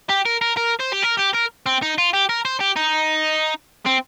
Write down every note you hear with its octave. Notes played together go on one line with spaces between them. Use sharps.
G4
A#4
A#4
A#4
C5
G4
A#4
G4
A#4
C4
D#4
F4
G4
A#4
C5
G4
D#4
C4